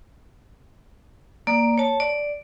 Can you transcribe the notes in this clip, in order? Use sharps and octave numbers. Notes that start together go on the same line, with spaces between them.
A#3 D5
C#5 A5
D5